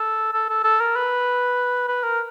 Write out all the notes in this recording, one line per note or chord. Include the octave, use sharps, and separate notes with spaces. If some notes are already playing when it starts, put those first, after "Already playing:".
Already playing: A4
A4
A4
A4
A#4
B4
B4
A#4